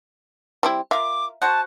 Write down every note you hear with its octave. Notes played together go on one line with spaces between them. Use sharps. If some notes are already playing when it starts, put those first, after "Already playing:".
G3 C4 E4
F4 A#4 E5 F5 D6
F#4 C5 F#5 A5